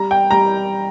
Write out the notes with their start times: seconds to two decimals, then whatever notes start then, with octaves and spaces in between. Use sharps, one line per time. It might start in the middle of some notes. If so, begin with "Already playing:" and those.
Already playing: G3 A#5
0.11 G5
0.31 G3 A#5